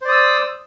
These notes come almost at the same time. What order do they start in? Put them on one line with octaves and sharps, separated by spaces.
C5 D5 D#6 E6